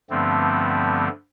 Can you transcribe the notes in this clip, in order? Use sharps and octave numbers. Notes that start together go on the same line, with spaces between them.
G2 D3 F3 A3 B3 C4